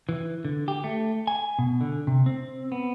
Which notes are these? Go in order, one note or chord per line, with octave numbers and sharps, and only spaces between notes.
E3
D3
G4
A3
G#5
B2
D3
C3
C4
B3